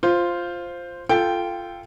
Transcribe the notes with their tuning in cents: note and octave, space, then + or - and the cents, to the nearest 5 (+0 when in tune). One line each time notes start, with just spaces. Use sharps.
F4 +0 C5 +0
F4 -10 A4 +0 G5 +0